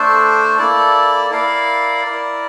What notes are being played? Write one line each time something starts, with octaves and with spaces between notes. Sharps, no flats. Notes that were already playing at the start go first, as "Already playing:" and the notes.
Already playing: A3 D4 A4 C5
A#3 E4 A4 D5
E4 A#4 D5 F5
E4 A#4 D5